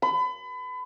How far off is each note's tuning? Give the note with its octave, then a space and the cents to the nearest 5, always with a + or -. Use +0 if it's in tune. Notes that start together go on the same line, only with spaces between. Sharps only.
B5 +30